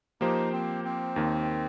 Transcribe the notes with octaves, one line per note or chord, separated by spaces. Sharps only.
F3 A#3 D#4 G4 C5
C4
C4
D#2 D#3 A#3